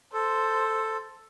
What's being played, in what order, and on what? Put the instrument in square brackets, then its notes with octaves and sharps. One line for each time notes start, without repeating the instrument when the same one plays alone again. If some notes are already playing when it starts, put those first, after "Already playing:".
[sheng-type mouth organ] A4 [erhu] C5